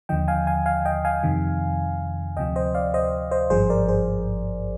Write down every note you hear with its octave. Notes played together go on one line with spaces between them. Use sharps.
D#2 D3 F3 D#5 G5
F5 G#5
F5 G#5
F5 G#5
D#5 G5
F5 G#5
F2 C3 D#3
D2 C3 F3 D#5 G5
C5 D#5
D5 F5
C5 D#5
C5 D#5
G#1 G2 F3 G#4 C5
A#4 D5
G#4 C5